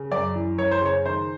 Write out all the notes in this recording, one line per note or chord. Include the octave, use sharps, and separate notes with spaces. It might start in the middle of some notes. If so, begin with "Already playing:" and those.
Already playing: C#3
F#2 D5
E3
F#2 C#5
C5
C#3 C#5
D#3 C5